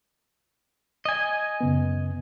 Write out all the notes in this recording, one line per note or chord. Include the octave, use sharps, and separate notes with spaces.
D#5 G#5
F#2 C#3 B3